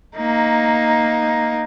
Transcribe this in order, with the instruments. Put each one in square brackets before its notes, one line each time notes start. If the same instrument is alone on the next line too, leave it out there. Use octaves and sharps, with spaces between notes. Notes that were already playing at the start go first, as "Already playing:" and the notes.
[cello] A#3 D#4